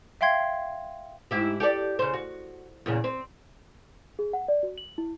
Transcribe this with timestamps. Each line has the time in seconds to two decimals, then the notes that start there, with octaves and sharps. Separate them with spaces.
0.21 E5 F5 G5 C6 G#6 C7
1.31 G#2 E4 G4
1.60 G4 A4 D5
1.99 C#3 C5
2.14 F#4
2.86 E2 A#2 C#3
3.04 C4
4.19 G#4
4.33 F#5
4.48 D5
4.63 F#4
4.78 F#7
4.98 E4